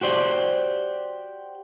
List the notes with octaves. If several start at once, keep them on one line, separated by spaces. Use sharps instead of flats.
F#4 G4 C5 D5